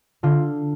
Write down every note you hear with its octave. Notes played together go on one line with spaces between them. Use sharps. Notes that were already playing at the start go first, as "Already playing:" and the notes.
D3 F4